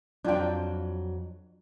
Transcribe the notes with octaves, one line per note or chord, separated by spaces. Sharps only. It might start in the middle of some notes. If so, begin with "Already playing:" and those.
F2 F#3 D4 F4 G5